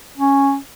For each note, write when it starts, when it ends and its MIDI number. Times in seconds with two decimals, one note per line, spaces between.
0.17 0.57 61